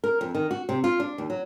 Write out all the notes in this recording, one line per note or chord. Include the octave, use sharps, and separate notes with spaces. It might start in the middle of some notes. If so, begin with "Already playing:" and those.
A#4
F2
D#3
F#4
C3
F4
D4
D#2
F#3